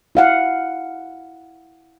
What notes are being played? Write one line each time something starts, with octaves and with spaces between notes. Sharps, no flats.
E4 F5 F#5